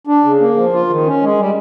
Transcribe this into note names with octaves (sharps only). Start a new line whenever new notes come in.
D4
C#3
A#3
F3
F4
D#3
C#4
G#3
G3